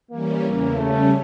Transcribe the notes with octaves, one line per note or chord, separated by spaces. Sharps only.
E3 G3 A#3 C#4
E2 C#3 E3
C#3 G3 A3 C#4